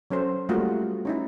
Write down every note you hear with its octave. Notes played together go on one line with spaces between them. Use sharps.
F#3 C#4 A4 C5
G3 A3 A#3 F4 F#4
C#4 D#4 E4